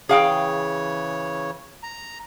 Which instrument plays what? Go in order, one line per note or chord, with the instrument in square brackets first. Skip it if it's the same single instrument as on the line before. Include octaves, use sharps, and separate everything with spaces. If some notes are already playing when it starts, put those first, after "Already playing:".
[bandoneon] C#3 E3 C#5 [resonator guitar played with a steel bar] G#4 F5 G5
[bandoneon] A#5